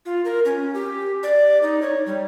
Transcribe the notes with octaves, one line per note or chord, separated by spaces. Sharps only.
F4
A#4
C#4
G4
D5
D#4
C#5
G3